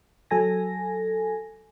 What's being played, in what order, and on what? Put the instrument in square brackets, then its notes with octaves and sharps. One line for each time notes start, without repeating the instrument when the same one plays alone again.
[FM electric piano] F#3 A4 G#5 A#6